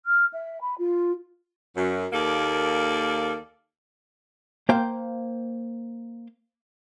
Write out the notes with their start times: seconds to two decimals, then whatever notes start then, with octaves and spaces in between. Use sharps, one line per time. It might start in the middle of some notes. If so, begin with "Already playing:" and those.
0.06 F6
0.34 E5
0.61 B5
0.79 F4
1.76 F#2
2.13 D#2 A#3 A4 D5
4.69 A#3 C5 F5 G5